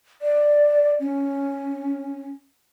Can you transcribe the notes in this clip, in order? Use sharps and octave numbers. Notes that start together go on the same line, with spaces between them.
D5
C#4